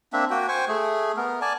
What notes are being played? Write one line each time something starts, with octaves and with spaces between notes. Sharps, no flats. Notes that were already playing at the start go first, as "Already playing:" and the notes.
A#3 C4 D4 E5
A#3 F#4 G5
C5 G5 G#5 C#6
A3 G#4
B3 A#4
D5 G#5 A5